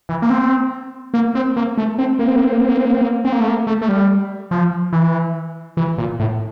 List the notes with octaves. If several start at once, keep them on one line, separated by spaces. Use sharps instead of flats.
E3
A#3
C4
A#3
C4
A#3
A3
C4
A#3
C4
A#3
C4
A#3
C4
A#3
C4
A#3
C4
A#3
C4
A#3
A3
A#3
A3
A3
G3
F3
E3
E3
A#2
A2